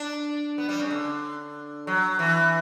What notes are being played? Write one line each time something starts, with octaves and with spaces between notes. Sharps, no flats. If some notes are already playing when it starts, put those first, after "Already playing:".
Already playing: D4
B3
G3
C#3
D3
F#3
E3